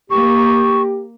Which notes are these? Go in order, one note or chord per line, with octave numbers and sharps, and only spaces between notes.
A#3 G4 C#6